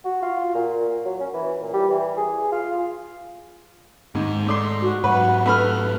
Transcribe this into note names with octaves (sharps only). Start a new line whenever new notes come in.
F#4
F4
A#2
F#3
C#4
E3
A#2
G3
E3
G#4
F4
D#2 G#2
A3 D5 C6
F#4
G#2 F#3 B4 F#5
A3 B4 B5 F6